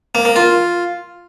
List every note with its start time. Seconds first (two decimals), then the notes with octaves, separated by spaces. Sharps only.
0.15 A#3
0.25 A#3
0.36 F4